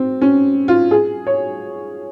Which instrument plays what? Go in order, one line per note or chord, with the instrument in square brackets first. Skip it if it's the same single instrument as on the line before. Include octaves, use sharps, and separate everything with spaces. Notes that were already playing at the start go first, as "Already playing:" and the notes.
Already playing: [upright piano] C4
C#4
F4
G#4
C#5